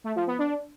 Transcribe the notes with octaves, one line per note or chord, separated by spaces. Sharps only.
A3
F3
B3
D4